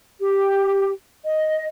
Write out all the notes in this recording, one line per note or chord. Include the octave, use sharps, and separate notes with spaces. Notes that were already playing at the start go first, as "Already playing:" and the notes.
G4
D#5